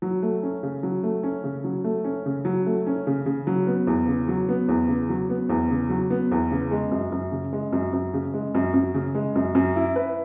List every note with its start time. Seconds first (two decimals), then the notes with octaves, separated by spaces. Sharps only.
0.02 F#3
0.22 A3
0.43 C#4
0.63 C#3
0.83 F#3
1.03 A3
1.23 C#4
1.44 C#3
1.64 F#3
1.84 A3
2.04 C#4
2.26 C#3
2.45 F#3
2.66 A3
2.87 C#4
3.07 C#3
3.26 C#3
3.47 F#3
3.67 B3
3.87 E2
4.08 C#3
4.28 F#3
4.49 B3
4.68 E2
4.88 C#3
5.09 F#3
5.29 B3
5.49 E2
5.71 C#3
5.90 F#3
6.10 B3
6.31 E2
6.51 C#3
6.71 G#3
6.91 F#2
7.12 F#2
7.32 C#3
7.53 G#3
7.72 F#2
7.93 F#2
8.14 C#3
8.34 G#3
8.54 F#2
8.74 F#2
8.94 C#3
9.15 G#3
9.35 F#2
9.55 F#2
9.76 E4
9.96 B4